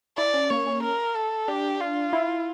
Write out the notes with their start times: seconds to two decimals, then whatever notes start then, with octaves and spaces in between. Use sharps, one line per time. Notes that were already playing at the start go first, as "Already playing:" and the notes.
0.18 E4 D5
0.34 C#4
0.50 A#3 C#5
0.67 C#4
0.83 A#4
1.16 A4
1.48 D4 G4
1.81 F4
2.13 E4